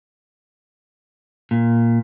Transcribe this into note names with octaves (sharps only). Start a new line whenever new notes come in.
A#2